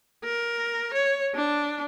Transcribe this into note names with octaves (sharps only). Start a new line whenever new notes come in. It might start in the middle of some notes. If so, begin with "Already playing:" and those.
A#4
C#5
D4